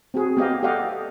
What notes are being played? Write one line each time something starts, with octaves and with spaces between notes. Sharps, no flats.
C4 F#4 G#4
B3 G4 D#5 F5
G4 A4 D5 D#5 F5 F#5